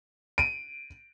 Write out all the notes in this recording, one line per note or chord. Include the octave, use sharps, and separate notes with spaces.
D7 D#7